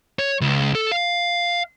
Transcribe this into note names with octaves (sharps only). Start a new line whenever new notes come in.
C#5
C#2
A4
F5